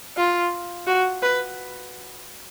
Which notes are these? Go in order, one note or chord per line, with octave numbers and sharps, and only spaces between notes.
F4
F#4
B4